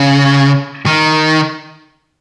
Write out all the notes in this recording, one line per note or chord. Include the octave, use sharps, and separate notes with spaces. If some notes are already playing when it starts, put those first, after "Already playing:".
Already playing: C#3
D#3